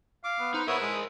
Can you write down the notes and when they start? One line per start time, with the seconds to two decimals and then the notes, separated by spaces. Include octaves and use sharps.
0.24 F5 D6
0.40 B3
0.54 D#4 B4 C5
0.67 B3 E4 A#4 C5 C#5 E5 D#6
0.82 G#3 D#6